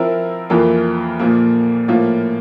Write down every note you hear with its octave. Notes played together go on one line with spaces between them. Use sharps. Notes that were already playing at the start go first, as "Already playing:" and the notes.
Already playing: F3 C4 E4 A#4
F2 E3 A#3 F4 A#4
A#2 F3 A#3
A2 F3 A#3 F4